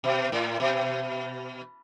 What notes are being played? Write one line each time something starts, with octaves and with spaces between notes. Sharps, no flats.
B2
A2
B2